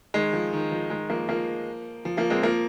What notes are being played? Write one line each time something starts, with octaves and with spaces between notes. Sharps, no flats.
D#3 G#3
F3
D#3
F3
D#3 G#3
F3 A#3
F3 A#3
F3
F3 A#3
G#3 C4
F3 A#3